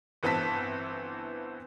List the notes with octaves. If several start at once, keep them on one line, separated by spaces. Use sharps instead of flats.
G1 E3 B3 C4 A5 B6